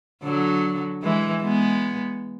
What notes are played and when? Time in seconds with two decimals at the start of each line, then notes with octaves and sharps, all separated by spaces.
0.23 D3 F#3
1.02 E3 G#3
1.42 G#3 B3